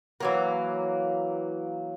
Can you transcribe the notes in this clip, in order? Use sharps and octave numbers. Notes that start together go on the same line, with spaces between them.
E3 F#3 A#3